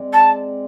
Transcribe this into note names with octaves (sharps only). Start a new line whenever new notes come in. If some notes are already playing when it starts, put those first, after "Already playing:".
Already playing: G#3 C4 G#4 D5
A5